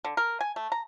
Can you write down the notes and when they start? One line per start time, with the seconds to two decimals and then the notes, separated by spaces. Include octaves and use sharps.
0.04 D3
0.17 A#4
0.41 G#5
0.56 A3
0.72 A#5